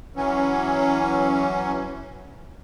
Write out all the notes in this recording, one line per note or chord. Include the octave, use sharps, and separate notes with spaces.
E3 F#3 C#4